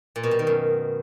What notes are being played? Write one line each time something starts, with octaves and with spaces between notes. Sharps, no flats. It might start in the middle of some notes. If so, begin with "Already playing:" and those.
A#2
B2
G3
D#3
F#2